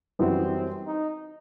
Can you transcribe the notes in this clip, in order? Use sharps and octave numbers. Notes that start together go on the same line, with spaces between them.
F#2 E3 G3 B3 C4 F#4
D#4